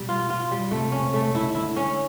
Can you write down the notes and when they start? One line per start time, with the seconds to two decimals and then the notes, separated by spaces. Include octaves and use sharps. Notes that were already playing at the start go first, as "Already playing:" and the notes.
Already playing: B2 G3
0.09 F4
0.30 F4
0.51 G3
0.71 C3 A3
0.92 C#4
1.00 C3
1.14 A3
1.27 C#3
1.34 C3 E4
1.42 C#3
1.55 D3 E4
1.76 C#4